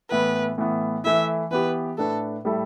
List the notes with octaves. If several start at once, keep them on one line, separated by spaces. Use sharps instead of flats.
A2 E3 B3 E4 B4
A2 E3 B3
E3 A3 E4 E5
E3 B3 G4 B4
A2 A3 D4 A4 B4
A2 G3 E4 A4